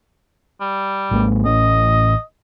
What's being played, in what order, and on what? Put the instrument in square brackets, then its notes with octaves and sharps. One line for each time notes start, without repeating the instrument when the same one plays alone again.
[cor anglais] G3
[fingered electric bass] G#1 G#3 A#3
[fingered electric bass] A1 C#4 [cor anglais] D#5